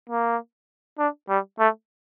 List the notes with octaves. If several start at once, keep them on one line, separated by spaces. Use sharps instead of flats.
A#3
D4
G3
A3